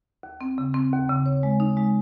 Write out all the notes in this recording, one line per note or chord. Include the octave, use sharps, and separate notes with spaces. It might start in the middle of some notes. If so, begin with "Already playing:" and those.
D#2
C4
C#3
C4
D#2
C#3
C#5
G#3
D#4
G#3